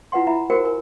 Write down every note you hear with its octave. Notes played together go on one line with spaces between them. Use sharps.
E4 F4 B4 F#5 C6
E4 E5 A#5 B5
F#4 G4 A#4 C5 G5
A#4 G#5